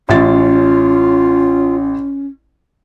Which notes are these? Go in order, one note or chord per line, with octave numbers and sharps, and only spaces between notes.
A1 C#4 F4 E5 A6